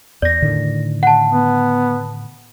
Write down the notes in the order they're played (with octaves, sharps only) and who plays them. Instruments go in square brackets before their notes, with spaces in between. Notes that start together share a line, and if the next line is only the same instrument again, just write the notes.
[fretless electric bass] E2 [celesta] D5 A#6
[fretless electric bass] A2 D3 D#3
[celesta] F#5 A5
[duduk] B3